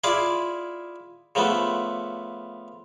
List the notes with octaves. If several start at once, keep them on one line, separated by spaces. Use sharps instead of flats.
E4 F4 G#4 D5 F5
C#3 F3 A3 B3